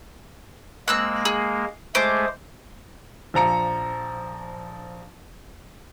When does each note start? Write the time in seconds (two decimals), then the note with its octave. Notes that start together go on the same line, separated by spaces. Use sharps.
0.88 G#3 A#3 C4 E6 F#6
1.25 G#4
1.95 G#3 A3 G#4 C5 D6
3.34 A#1 F3 A#5 C#7